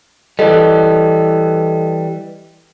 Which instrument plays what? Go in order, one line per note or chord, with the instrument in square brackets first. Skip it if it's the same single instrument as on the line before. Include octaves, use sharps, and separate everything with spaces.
[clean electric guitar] E3 G3 [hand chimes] A4 D#5